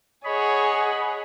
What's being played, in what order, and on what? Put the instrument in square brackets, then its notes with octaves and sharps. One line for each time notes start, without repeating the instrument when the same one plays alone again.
[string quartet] G#4 F#5 [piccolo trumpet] C#5 [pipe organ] D#5 B5